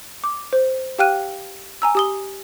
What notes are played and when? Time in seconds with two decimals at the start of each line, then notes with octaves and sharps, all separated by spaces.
0.24 D6
0.53 C5
0.99 G4 F5 G5 F6 F#6 D#7
1.82 G#5 A#5 E6
1.95 G4 D#6 G7